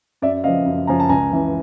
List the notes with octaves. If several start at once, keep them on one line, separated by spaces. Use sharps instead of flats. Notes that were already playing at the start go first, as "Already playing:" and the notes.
F#2 D5 E5
C#3 F3 D#5 F5
F#2
C#3 F3 G#5 A#5
A5
C#2 G#5 A#5
C#3 E3